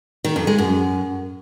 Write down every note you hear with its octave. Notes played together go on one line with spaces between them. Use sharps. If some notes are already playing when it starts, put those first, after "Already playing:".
D#3
F2
G#3
F#2